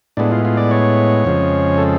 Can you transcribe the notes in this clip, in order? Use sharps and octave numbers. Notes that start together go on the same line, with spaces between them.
A2 G#3 B3 D4
F4
F4
D5
C#5
F2 C#3 F3 G#3
A4